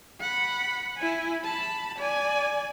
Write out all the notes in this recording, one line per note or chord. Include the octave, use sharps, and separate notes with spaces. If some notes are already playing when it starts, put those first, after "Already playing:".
F#5 B5
E4 G#5
A5 B5
D5 G#5